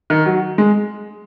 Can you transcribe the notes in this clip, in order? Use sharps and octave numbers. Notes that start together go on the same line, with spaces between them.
D#3
F#3
G#3